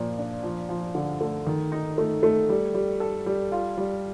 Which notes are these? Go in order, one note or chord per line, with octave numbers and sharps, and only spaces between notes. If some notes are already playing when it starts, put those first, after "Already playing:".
Already playing: A#2 F3
D4
F3
F3
D3
A3
D#3
D#4
A3
A3
G3
G3
A4
G3
F4
G3